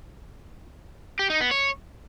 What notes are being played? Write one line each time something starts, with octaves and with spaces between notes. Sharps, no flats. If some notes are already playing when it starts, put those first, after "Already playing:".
G4
D#4
B3
C#5